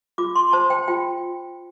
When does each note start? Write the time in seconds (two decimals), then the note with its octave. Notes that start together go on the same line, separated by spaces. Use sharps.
0.18 F4 D6
0.36 C6
0.53 C5 A5
0.70 G5
0.88 F4 G5